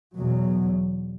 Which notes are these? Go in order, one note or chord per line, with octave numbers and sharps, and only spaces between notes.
E2 B2 F#3